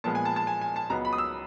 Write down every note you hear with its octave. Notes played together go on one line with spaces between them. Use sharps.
A#2 F3 G#3 B3 A5
G#5
A5
A5
G#5
G#5
A5
C#2 C#3 F#3 B3 A#5
B5
D#6
E6